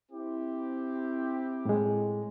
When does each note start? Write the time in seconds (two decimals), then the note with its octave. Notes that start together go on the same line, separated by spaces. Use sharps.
0.12 C4 E4 G4
1.65 A2 G#3